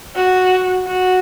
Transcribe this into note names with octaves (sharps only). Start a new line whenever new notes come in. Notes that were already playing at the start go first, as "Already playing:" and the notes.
F#4
F#4